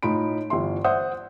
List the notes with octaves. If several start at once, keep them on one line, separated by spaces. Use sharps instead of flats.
A2 D#4 F4 B5 D7
G1 E3 F4 E5 C6
C5 D5 E5 F#5 D#6 G6